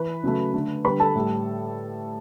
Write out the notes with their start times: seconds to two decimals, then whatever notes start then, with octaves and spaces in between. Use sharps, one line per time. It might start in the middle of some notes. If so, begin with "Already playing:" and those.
Already playing: E3 B4 B5
0.24 C#3 F#3 A3
0.54 D3 A3
0.85 D3 G3 B4 B5
1.00 A4 A5
1.15 A2 G3